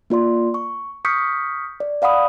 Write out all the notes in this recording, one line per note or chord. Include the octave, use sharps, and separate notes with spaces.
A#3 F4 D5 C6
C#6
C#6 D#6 F6 G6 B6 C#7
D5
D5 F5 F#5 B5 D#6